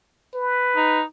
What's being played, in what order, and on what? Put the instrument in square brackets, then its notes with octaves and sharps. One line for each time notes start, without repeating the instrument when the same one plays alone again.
[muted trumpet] B4
[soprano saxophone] D#4